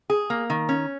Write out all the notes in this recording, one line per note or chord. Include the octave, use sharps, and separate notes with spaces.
G#4
A#3
D#3
C#4